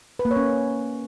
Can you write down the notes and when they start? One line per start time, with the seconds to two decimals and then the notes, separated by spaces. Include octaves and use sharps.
0.19 B4
0.25 A#3
0.31 C#5
0.36 C#4